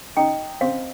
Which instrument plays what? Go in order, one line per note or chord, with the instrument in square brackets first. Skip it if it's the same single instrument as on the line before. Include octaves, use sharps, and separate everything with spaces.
[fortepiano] D#4 [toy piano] G5
[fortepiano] C4 [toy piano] F5